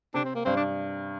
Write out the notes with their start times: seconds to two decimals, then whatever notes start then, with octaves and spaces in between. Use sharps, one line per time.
0.14 C3 D4
0.25 C4
0.35 A#3
0.45 G2 C4
0.57 D4